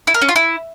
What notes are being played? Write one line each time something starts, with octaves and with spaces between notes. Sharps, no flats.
E4
A#4
C#4
F4
E4